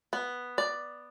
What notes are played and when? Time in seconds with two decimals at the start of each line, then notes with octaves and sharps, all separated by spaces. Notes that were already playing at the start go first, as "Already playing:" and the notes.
0.13 B3
0.58 D5